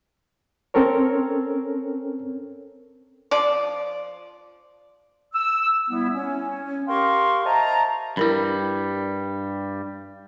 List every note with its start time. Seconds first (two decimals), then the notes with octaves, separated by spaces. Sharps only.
0.74 C4 C#4 A4 A#4 C#5
3.31 F3 D5
5.34 E6
5.90 G3 B3 E4
6.14 C#4
6.87 G4 A#4 F5 G5 C6 C#6
7.45 C5 D#5 E5 A5 A#5
8.17 G2 G3 E4 A#4 B5